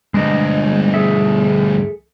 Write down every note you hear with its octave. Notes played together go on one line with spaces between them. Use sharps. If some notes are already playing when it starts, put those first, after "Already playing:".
D2 G2 G#3 D4 D#5
G#4 A4 E5